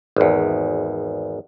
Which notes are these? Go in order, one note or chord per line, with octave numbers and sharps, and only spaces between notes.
G#1 E2